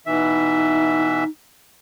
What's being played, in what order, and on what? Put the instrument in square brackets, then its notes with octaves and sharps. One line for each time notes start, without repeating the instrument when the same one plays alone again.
[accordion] B2 E3 E5 [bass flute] D#4